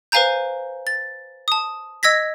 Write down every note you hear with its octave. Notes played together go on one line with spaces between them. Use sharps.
B4 C5 F5 G#5 A#5 G6
A6
A5 D#6
D#5 E6 G#6 A#6 B6